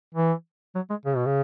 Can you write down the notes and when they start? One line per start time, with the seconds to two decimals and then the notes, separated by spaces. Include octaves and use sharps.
0.15 E3
0.75 F#3
0.90 G#3
1.05 C#3
1.16 B2
1.26 C#3